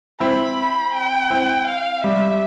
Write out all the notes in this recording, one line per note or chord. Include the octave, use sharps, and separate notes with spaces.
C4 E4 B5
G5
C4 E4
F5
G3 E5